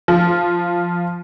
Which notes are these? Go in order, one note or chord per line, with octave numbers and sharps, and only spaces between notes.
F3